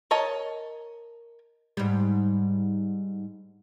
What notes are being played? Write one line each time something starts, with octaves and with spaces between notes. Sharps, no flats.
A#4 C#5 D#5 A5
G#2 G3